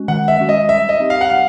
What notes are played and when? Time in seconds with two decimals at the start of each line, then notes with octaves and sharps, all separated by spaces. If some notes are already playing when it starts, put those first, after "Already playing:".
Already playing: G#3 C#4 F#4
0.08 D#3 F#5
0.28 E5
0.39 G#3 C#4 F#4
0.49 D#5
0.69 G3 E5
0.89 D#5
1.00 C4 D#4 G4
1.10 F5
1.21 F#5
1.30 G3 F5